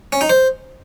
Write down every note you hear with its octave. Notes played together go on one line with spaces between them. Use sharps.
C#4
D#4
C5